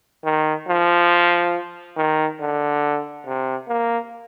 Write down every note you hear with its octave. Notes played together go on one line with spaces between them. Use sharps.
D#3
F3
D#3
D3
C3
A#3